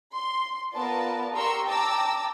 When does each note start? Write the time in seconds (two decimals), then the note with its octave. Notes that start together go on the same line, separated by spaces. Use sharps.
0.15 C6
0.73 B3 F4 A#4 B4 D5 A5
1.33 G4 A#4 A#5 C6 C#6 E6
1.66 G5 A5 A#5 D6 E6